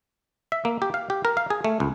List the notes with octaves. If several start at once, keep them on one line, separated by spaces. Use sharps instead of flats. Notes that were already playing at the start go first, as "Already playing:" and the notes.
E5
A#3
G4
F5
G4
A#4
F5
G#4
A3
C#2